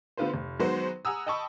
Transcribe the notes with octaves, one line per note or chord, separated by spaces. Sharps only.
D3 B3 F4 B4 C5
F1
D#3 F#3 G#3 B3 F#4 C5
F#5 G#5 A#5 D#6 E6
D#5 G5 A5 B5 C#6 D#6